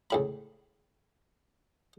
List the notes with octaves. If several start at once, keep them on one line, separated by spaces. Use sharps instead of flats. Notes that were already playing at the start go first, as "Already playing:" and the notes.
C#2 A2 B5